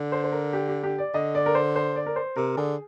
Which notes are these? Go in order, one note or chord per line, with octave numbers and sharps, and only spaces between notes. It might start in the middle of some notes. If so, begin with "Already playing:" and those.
Already playing: D3
C5
C5
A#4
G4
G4
G4
D5
D3 D#5
D5
A#4
C5
C5
D5
A#4
C5
C3 A#4
D3 G#4